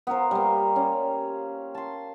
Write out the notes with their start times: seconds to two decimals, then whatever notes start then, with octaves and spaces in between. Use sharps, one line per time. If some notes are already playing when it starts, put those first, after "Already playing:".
0.07 B3 F4 A#4 C5
0.31 G3 A#3
0.76 C#4
1.75 A5 C6